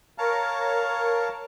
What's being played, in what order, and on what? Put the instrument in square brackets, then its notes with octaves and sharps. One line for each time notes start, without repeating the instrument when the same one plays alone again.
[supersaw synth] A#4 C#5 [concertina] F5 A5 A#5